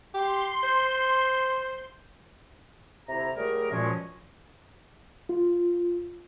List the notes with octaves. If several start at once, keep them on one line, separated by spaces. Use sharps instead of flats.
G4 C6
C5
D2 C3 E4 A#5
F#3 G3 A3 G#4 A#4
C#2 F#2 A#2 F3 G#3 C#4
F4